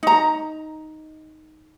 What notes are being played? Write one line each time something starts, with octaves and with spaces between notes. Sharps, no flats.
D#4 A#5